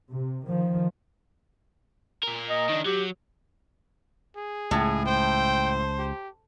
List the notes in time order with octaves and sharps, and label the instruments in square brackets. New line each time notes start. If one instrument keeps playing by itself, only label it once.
[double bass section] C3
D#3 F3
[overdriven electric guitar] A#2 A#4
[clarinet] D#5
[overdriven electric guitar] D#3 D4
[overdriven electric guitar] F#3 [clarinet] G4
[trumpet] G#4
[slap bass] C#2 [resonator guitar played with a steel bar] A2
[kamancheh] C5 [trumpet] G5
[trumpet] G4